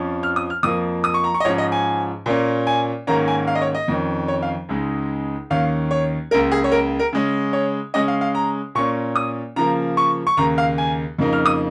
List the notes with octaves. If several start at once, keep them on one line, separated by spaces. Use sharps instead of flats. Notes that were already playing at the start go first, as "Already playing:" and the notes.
Already playing: F2 F3 C#4
F6
D#6
F6
F2 F3 A#3 D#6
D#6
C#6
A#5
C#6
D#5
G#2 F3 C#4 C#5
D#5
G#5
A#2 A#3 C#4
G#5
G#2 D#3 A#3 C#4 A#5
G#5
F5
D#5
C#5
D#5
F2 D#3 C#4
C#5
F5
C#2 C#3 G#3 D#4
D#2 D#3 C#4 F5
C#5
C#2 C#3 A#3 A#4
G#4
C#5
A#4
A#4
C#3 G#3 C#4
C#5
C#3 G#3 C#4 D#5
F5
F5
A#5
A#2 A#3 C#4 C#6
D#6
C#3 F3 A#3 A#5
C#6
C#6
D#2 C#3 A#3 A#5
F5
G#5
F2 C#3 A#3 D#4
F6
D#6